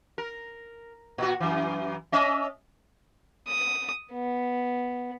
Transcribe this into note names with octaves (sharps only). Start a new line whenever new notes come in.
A#4
A#2 F#4
F#2 E3
C#4 D#5 E5
D#6
B3